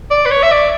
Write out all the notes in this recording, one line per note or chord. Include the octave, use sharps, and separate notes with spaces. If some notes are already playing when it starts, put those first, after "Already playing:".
D5
B4
C#5
E5
D5